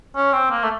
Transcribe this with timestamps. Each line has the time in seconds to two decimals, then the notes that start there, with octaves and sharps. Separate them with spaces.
0.16 C#4
0.33 C4
0.51 A#3
0.63 A3